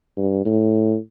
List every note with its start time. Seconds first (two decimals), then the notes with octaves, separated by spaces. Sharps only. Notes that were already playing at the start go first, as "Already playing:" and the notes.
0.17 G2
0.45 A2